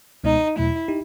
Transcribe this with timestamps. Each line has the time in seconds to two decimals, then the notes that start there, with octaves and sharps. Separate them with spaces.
0.24 C#2 B2 G#3 B3 D#4
0.56 E2 B2 F#3 A3 E4
0.88 D#4 G4